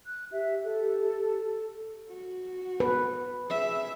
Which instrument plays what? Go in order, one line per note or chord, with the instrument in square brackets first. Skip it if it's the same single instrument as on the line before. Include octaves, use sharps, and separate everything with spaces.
[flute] F#6
[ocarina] G4 [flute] E5
[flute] A4
[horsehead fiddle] F#4
[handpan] B4
[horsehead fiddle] G#4 E5